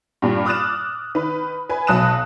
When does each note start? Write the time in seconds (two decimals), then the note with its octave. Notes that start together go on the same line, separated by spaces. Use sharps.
0.22 G2 A#2
0.46 D6 D#6 F6 F#6 A6 E7
1.15 D#3 B4
1.69 B4 G#5
1.87 B1 F#3 A5 D#6 F#6 E7